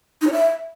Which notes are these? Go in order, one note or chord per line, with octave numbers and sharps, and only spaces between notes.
D#4
C#5
E5